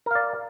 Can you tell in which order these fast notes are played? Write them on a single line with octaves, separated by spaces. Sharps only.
A#4 F5 D5